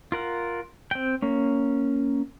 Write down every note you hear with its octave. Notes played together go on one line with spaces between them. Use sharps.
F4 A#4 F#5
C4 G5
A#3 C#4